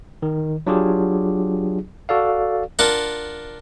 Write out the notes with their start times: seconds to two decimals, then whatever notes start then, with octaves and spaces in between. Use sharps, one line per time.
0.22 D#3
0.67 F#3 D4 F4 G4 G#4
2.09 F#4 A4 D5 F5
2.79 D4 F4 A#4 F#5